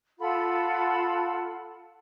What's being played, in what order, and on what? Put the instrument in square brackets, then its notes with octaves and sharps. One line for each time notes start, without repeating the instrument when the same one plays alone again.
[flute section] F4 A4 F#5 B5